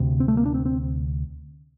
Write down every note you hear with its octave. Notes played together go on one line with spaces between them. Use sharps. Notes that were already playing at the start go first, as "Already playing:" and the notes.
Already playing: D2 C3
C4
A3
A#3
D4
C4
C4